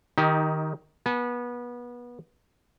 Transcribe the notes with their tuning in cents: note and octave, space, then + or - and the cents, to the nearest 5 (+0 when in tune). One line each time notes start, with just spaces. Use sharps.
D#3 +0 D#4 +25 G4 -10
B3 -25 G#5 +45